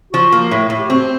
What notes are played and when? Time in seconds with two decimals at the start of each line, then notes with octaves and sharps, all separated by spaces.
0.13 F3 F#4
0.32 A#3
0.51 A2
0.70 A2
0.79 G4
0.89 C4 F#4